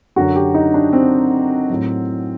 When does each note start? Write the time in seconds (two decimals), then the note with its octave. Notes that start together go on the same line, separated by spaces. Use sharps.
0.16 F#2 D3 F#3 F#4
0.36 G4
0.54 D#4
0.74 D4
0.93 C4
1.70 A2 F#3